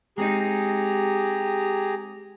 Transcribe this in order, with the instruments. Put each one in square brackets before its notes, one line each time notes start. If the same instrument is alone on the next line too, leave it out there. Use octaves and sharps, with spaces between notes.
[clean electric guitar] G#3 C4 D#4 [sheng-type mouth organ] G4 G#4 A#5